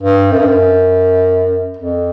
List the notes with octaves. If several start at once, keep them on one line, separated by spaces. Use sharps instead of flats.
G2
F#2
G2
F#2
F2